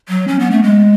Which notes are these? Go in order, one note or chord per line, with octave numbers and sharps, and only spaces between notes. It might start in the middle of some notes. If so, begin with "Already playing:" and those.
F#3
C#4
B3
A3
G#3